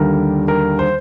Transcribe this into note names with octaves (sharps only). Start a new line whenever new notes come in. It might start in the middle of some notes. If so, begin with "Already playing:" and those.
Already playing: D#2 D3 G3 A#4
A#4
C5